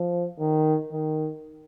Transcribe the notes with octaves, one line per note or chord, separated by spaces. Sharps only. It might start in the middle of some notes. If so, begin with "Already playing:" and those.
Already playing: F3
D#3
D#3